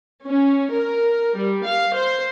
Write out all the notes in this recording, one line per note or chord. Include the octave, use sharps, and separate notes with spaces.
C#4
A#4
G3
F5
C5